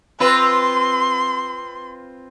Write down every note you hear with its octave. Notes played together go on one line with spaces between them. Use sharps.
C4 F4 B4 C6